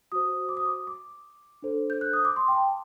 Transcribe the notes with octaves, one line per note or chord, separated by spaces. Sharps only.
F#4 C5 D#6
D6
D#6
D6
D6
D4 A4 C5
G6
F#6
D#6
D6
C6
G5
A5